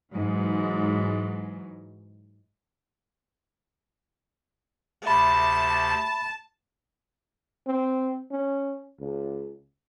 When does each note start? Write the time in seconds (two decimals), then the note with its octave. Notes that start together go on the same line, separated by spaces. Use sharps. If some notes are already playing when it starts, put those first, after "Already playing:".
0.14 G#2 E3 F#3
5.06 D2 C3 E5 A5 B5
7.67 C4
8.32 C#4
9.00 C#2